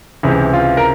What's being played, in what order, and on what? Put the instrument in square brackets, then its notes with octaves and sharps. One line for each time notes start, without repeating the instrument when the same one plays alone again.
[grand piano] C#2 C3 E3
F4
A#4